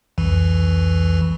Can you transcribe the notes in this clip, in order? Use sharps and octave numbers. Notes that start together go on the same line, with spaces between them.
C2 F2 E3